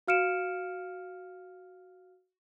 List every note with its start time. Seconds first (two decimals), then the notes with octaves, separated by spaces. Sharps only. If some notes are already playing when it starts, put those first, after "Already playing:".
0.08 F#4 F5 F6 C#7 D7 E7